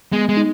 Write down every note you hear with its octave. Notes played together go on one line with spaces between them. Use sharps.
G#3 B3
G#3
D#4